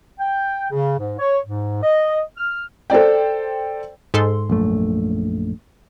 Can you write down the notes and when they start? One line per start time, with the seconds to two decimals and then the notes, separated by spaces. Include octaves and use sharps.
0.20 G5
0.71 C#3
0.99 G#2
1.19 C#5
1.46 G#2
1.83 D#5
2.38 F6
2.90 A4 C5 D5 G5
4.14 G#2 A4 C6
4.50 A#1 F#2 A3